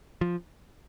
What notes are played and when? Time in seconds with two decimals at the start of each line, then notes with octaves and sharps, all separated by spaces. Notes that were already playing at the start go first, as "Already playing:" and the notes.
0.21 F3